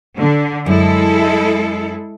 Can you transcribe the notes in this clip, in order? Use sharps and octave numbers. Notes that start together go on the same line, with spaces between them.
D3
F#2 G#3 E4 A4